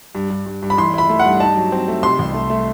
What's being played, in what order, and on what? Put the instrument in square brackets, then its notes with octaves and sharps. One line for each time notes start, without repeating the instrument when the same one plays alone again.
[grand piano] G2
G2
G2
G2
[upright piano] B5
[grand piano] E3 [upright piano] C6
[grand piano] E4 [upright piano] B5
[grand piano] A3
[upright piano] F#5
[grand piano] G2
[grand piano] D#4 [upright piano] A5
[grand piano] F#3
C4
A3
[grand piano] C3 [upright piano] C6
[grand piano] C2
A3
A3